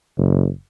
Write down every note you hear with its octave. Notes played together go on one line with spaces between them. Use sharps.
F#1